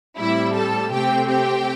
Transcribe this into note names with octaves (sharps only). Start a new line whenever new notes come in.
A2 G3 C4 E4 E5
A4 A5
C3 A3 C4 G4 G5
G4 G5